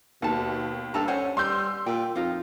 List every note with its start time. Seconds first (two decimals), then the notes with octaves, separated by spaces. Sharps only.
0.22 D#2 B2 A4 A5
0.94 G2 A4 A5 A#5
1.08 C#4 C5 F#5 G#5
1.37 G3 C6 E6 G6
1.86 A#2 G5
2.15 F2 D#4 F4 C5